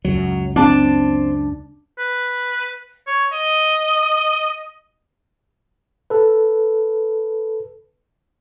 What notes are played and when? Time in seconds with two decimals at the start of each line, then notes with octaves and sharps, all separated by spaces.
0.05 C#2 F#2 F#3
0.56 C4 D4 A5
1.99 B4
3.07 C#5
3.32 D#5
6.10 A4 B4